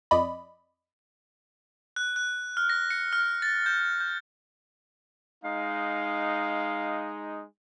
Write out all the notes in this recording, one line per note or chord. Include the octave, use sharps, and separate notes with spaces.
F2 D5 D#5 B5
F#6
F#6
F6
A#6
C#7
F6
A6
G6
G6
G#3 D#4 F5